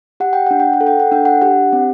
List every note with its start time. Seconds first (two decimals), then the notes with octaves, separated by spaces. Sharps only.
0.20 G4 F#5
0.33 G5
0.46 D4 F#5
0.60 G5
0.73 F#5
0.81 A4
0.87 G5
1.00 F#5
1.12 D4 G5
1.25 F#5
1.42 G4 F#5
1.73 C4